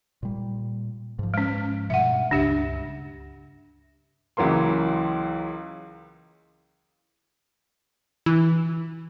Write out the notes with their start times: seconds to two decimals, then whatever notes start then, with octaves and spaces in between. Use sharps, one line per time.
0.23 A#2 G3
1.19 G#2 F3
1.34 G#3 C#4
1.90 G2 B2 E5 F#5
2.31 C#2 G2 C#3 D4 G4 E5
4.37 C#2 E3 F#3 A#3 C6
8.26 E3